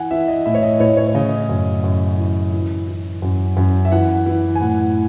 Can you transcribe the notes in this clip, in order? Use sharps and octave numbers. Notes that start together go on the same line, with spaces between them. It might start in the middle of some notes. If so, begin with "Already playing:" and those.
Already playing: E3 F#5 G#5
E3 E5
D#5
A2 E5
C#5
D#5
A2 C#5
C#5
C#5
C#3 D#5
F#2
F#2
E3
E3
E3
F#2
F#2
E5
E3 F#5
E3
G#5
A2 F#5